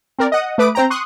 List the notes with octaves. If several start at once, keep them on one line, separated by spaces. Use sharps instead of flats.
C4 A#4 D5
D#5 F#5 D#6
A3 B4 D6 D#6 D7
C4 C5 G5 A#5
C6 C#6 D#6 F#6